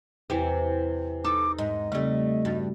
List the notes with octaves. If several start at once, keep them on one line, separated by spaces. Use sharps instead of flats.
E2 C3 E3 G4 C5
D#4 A4 D6
G#2 D#5
C#3 G3 A3 C4
G2 F#4 A6